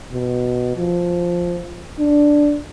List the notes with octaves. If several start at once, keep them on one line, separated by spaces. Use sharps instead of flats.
B2
F3
D4